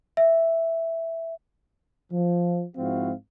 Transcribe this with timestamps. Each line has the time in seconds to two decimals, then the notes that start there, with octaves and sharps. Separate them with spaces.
0.17 E5
2.12 F3
2.77 G#2 F3 C4 E4 F#4 F5